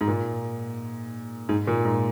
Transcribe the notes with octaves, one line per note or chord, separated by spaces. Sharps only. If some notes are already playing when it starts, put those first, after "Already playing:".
G#2
A#2
G#2
A#2
G#2